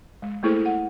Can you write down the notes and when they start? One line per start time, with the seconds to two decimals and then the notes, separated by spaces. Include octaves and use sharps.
0.22 G#3
0.43 A3 A#3 E4 G#4 A4 C5
0.65 F#5